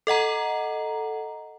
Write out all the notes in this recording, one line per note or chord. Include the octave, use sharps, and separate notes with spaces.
A4 D#5 F#5 A#5